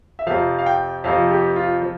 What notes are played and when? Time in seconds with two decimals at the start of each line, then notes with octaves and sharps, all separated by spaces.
0.19 E5
0.27 F2 C3 F3 F5
0.58 F5
0.66 G5
1.04 F2 C3 F3 F5
1.31 G4
1.56 F4
1.82 F3